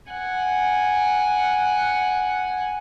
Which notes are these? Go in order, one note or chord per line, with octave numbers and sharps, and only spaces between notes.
F#5 G#5